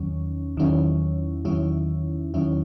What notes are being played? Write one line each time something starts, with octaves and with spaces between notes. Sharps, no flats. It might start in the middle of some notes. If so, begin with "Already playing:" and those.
Already playing: E2 D#3 F#3 C#4
E2 D#3 F#3 C#4 E4
E2 D#3 F#3 C#4 E4
E2 D#3 F#3 C#4 E4